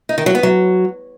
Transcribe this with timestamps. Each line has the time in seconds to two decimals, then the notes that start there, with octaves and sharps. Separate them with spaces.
0.09 D#4
0.18 D#3
0.26 F#3
0.35 B3
0.43 F#3